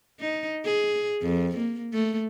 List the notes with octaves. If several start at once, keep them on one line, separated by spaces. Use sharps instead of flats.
D#4
G#4
F2
A#3
A3